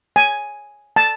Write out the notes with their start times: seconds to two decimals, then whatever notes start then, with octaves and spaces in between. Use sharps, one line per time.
0.16 G#5
0.96 A5